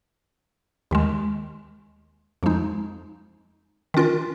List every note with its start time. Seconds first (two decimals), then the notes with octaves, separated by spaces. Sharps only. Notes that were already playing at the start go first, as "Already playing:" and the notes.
0.91 D#2 D#3 G#3
2.43 F2 F3 G#3 D#4
3.94 D#3 C#4 F4 A#4